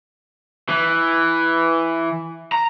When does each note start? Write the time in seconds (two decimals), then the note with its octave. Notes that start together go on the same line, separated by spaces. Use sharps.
0.70 E3
2.52 A#5